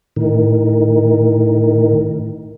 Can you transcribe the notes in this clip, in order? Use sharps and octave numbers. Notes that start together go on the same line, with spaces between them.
A2 D#3